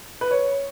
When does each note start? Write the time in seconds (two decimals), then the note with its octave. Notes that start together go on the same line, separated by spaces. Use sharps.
0.21 B4
0.31 C#5